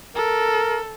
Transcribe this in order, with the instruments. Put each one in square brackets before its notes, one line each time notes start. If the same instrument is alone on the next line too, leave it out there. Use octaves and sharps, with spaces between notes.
[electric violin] A4 [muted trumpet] A#4